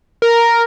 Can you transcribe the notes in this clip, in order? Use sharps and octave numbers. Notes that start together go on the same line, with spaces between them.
A#4